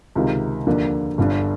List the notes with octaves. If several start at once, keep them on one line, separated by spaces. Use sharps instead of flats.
C#2 C3 D#3
D#2 D3 F3 A#3
G1 G2 D3